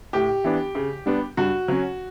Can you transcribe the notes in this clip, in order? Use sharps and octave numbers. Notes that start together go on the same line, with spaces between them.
A2 G4
E3 B3 D4
C#3
G3 B3 D4
G2 F#4
F#3 C#4